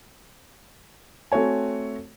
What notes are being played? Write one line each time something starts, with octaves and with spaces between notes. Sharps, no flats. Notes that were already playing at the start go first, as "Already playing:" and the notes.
A3 C4 F#4 C#5 G#5